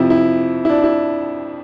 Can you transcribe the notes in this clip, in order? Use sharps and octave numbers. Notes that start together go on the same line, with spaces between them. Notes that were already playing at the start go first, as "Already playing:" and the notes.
Already playing: F2 C3 F3 E4
E4
E4
D4
E4